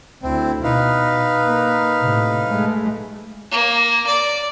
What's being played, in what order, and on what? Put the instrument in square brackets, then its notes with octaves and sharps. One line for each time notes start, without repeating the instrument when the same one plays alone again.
[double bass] D2 E4 [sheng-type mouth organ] C4
[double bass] B2 [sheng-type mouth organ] D#4 B4 F5
[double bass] A#3
A2 C3
G#3 A3
[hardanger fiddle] A#3
D5